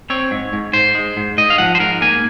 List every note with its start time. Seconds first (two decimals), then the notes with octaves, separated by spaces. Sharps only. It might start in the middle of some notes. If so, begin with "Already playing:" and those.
0.10 C4 C#5
0.31 G#2
0.53 G#2
0.73 G#2 C5
0.95 G#3
1.17 G#2
1.38 G#2 D#5
1.50 F5
1.58 F3 F#5
1.75 C5
1.79 G#2 A#4
2.01 A#3 G#5